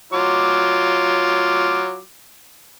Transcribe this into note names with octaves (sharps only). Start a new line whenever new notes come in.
F#3 F4 D6